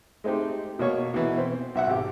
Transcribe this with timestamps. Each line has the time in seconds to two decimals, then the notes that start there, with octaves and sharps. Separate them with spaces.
0.24 G#3 A3 C4 D#4 G4
0.79 B2 A#3 C#5 C#6
1.14 B2 E3
1.38 C4
1.75 B1 E5 F#5
1.87 G#1 G4